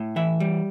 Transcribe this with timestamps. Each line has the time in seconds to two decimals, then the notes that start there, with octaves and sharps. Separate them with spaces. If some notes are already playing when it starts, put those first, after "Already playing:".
Already playing: A2
0.16 E3 E5
0.40 G3